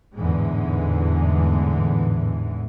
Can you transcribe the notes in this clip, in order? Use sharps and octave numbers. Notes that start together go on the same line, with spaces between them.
A1 E2 G#2 D3 E3 G#3